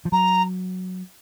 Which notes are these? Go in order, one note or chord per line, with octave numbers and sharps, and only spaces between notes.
F3
F#3 A#5